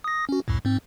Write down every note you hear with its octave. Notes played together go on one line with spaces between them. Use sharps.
D#6 A#6
C#4 F#4
C2 F2 A2
G#2 C4